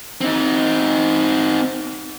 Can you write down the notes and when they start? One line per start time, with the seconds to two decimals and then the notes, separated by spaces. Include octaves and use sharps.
0.21 C4 D#4